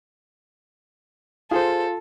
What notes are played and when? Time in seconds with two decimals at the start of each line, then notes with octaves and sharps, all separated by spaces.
1.51 F4 G#4 A4 C5